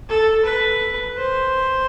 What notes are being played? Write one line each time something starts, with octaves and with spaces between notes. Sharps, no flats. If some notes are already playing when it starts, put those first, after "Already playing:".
A4
B4
C5